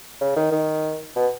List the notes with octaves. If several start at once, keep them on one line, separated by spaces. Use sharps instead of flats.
C#3
D#3
D#3
B2